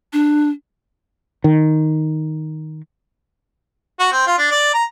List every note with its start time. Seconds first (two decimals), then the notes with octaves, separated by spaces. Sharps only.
0.13 D4
1.44 D#3
3.99 F#4
4.12 C4
4.27 F4
4.38 D4
4.51 D5
4.74 A#5